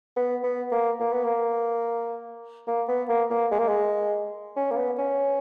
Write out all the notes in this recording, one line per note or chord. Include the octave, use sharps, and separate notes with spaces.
B3
B3
A#3
A#3
B3
A#3
A#3
B3
A#3
A#3
G#3
A#3
G#3
C#4
A#3
B3
C#4